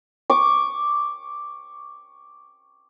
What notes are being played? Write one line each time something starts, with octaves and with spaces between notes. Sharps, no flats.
C#6 D6